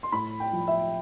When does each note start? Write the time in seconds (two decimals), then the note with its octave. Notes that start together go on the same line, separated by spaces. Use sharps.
0.03 C6
0.12 A2 B5
0.40 G5
0.53 F3
0.68 E5